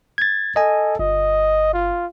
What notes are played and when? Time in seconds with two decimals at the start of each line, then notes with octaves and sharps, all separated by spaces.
0.18 G#6 A6
0.56 A4 D#5 G#5
0.99 G1 D#5
1.73 F4